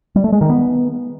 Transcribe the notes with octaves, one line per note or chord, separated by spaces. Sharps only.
G3
A3
G#3
D#3
B3